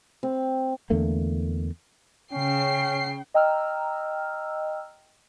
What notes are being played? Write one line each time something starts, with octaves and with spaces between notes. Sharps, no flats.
C4
E2 D3 A3 A#3
C#3 C#4 G5 C7
D#5 G5 A#5 E6 F6